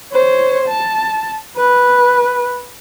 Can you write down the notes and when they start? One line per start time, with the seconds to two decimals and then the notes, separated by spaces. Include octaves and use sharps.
0.13 C5 C#5
0.68 A5
1.57 B4